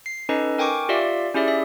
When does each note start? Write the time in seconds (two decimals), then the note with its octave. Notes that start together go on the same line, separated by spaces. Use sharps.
0.06 C7
0.29 C#4 D#4 A4 B4 D#5
0.58 A#4 G5 G#5 C#6 D6
0.89 F4 G4 D5 E5 F5
1.35 C#4 E4 G4 G#4 D5 E5
1.48 E5